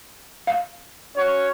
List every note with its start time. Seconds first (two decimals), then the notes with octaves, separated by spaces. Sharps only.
0.47 F5
1.17 C#4 F#4 C#5